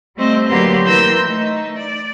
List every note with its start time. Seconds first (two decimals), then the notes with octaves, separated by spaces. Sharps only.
0.16 G3 A3 C4 C5 D#5
0.49 D3 F#3 A#3 G4 B4 C6
0.85 E3 A#3 A#4 C6 E6 G6
1.26 A3 D#4
1.78 D5